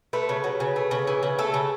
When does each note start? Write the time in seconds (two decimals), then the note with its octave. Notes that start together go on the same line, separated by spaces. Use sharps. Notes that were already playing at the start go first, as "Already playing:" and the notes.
0.13 A3 B4
0.29 C#3
0.44 F#3
0.60 C#3
0.76 A3
0.91 C#3
1.07 E3
1.23 C#3
1.39 A3 A4
1.54 C#3